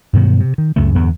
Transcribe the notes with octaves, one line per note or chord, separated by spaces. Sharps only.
G2 B2 D#3 F#3
C3
D#3
C#2 F#2 C#3 A3
E2 G2 D3 B3